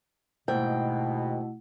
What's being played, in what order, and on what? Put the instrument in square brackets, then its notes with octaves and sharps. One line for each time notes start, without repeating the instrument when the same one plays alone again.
[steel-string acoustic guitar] D#2 G#2 G5 [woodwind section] B2 [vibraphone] A3 E4 F#5